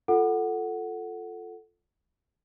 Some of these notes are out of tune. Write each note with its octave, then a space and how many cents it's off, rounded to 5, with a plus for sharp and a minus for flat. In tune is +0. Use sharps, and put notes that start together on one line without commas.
F4 +0 A4 +0 F#5 +0